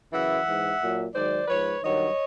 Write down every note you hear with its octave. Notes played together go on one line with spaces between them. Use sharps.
F#2 C#3 E3 E5 F#5
G#2 E3
A#2 F#3
G#2 D#3 F#3 C5 D5
G#2 F3 B4 C#5
G2 D#3 F#3 C#5 D#5